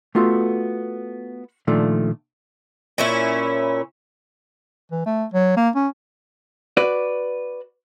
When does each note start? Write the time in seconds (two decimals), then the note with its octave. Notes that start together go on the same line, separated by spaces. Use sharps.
0.15 A3 B3 F4 F#4 A4
1.67 A#2 D#3 F3 A3 D4
2.98 A#2 C#4 E4
4.92 E3
5.06 A3
5.34 F#3
5.57 A#3
5.76 C#4
6.77 F#4 B4 D5